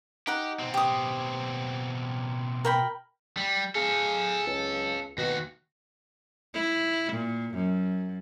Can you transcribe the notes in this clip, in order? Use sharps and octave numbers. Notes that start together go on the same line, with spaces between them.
D#4 G4 F#5
B2 C4
G4 D#6
A#4 G5 B5
G3
G#4 A4 F5
C#2
D#2 B2 F#4
E4
A#2
F#2